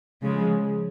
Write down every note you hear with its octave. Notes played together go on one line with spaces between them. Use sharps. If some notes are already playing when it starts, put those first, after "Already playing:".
C#3 F3 G#3